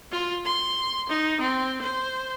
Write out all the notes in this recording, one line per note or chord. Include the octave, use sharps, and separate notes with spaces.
F4
C6
D#4
C4
C5